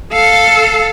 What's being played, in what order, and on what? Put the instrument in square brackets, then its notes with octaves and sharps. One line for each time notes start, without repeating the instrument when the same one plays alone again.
[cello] A4 F5